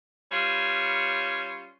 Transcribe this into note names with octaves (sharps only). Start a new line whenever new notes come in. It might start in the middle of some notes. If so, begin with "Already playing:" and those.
G3 C#4 F4 B4 C#5